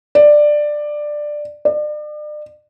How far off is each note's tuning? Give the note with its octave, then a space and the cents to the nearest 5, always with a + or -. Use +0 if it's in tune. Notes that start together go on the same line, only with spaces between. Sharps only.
D5 +10
D5 +35